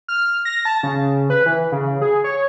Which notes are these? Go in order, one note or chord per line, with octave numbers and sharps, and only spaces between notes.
F6
A#6
A5
C#3
B4
E3
C#3
G#4
C#5